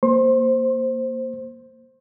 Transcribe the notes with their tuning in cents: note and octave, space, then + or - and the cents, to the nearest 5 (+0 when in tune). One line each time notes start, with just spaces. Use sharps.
A#3 +0 C5 +0 C6 +35